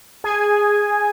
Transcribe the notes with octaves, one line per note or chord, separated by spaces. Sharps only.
G#4 G#5